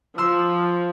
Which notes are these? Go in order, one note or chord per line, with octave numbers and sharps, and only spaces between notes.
F3 C6 E6